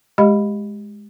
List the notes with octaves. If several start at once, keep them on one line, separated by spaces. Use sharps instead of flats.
G#3 G4 D#5 B5